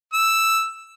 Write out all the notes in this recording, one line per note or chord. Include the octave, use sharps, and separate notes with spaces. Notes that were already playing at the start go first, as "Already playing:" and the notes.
E6